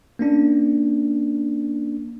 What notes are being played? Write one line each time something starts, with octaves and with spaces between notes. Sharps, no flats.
A#3 C#4 D4